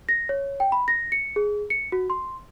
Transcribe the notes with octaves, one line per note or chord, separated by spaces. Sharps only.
A#6
C#5
G5
B5
A#6
C#7
G#4
C#7
F#4
C6